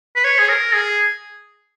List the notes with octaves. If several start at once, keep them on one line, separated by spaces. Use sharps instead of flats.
B4
C#5
G#4
A#4
G#4